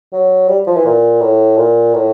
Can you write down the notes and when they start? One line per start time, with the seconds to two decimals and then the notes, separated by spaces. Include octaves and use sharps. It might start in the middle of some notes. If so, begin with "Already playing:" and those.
0.13 F#3
0.48 G3
0.67 F3
0.76 E3
0.85 A#2
1.21 A2
1.57 A#2
1.94 A2